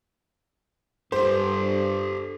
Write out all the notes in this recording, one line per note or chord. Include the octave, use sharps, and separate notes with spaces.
G2 G4 A4 C5